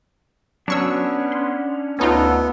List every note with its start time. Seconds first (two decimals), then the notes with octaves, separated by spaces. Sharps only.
0.68 F#3 B3 C#4 D4 C#6 E6
1.32 C6
1.99 D2 B3 C#4 D#4 F4 A4